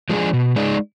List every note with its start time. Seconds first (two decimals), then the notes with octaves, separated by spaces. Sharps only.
0.09 F3 G#3 D4 G#4
0.33 B2
0.56 G#3 D#4 G#4 D5